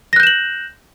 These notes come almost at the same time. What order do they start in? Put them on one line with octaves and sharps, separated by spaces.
A#6 F#6 G6 E7 F#7